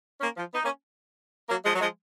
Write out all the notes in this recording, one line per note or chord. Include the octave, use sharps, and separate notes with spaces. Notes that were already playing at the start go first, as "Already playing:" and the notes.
A#3 C#4
F3
B3 D#4
A#3 C#4
F#3 A#3
F3 G#3
F#3
F3 G#3